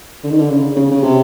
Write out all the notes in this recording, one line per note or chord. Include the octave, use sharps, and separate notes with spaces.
D3
D#3
D3
C#3
C#3
C#3
C3